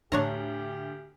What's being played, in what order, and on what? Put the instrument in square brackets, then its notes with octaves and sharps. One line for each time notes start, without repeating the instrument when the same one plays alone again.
[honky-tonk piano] D2 [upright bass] A2 A3 [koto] D4 C#5 A#5 [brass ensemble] G4